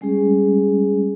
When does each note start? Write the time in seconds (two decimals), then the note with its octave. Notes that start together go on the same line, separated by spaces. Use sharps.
0.01 G3 G#3 C#4 G#4